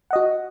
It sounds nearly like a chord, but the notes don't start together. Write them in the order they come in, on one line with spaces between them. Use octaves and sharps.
F#5 D#5 F#4